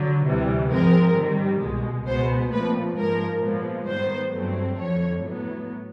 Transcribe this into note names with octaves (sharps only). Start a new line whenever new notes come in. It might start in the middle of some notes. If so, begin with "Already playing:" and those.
Already playing: D3 F#3
D2 C3 E3 G3
G#2 F3 G#3 C4 A#4
G#2 D#3 G3
C2 B2 G#3
C#2 B2 G#3 B3 C5
A#2 F3 A3 C4 B4
G#2 F3 G#3 A#4
A#2 F3 G#3 B3
G#2 D#3 G3 B3 C5
G2 D3 F#3 A3 C4
F2 D3 F3 C#5
A2 F#3 B3